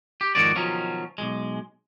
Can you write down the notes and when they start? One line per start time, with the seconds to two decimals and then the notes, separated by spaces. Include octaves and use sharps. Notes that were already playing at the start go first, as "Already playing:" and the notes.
0.21 G4
0.35 F2 G#2 D#3 F#4 C#5 D5
0.56 B2 D#3 F3 F#3 C#4
1.18 B1 F#2 G#3